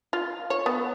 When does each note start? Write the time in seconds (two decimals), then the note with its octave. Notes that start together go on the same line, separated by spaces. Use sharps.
0.13 F4
0.50 C#5
0.66 B3